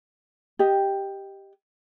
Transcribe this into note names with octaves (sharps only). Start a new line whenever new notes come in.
G4 D#5